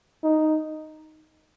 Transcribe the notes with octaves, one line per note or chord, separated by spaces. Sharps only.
D#4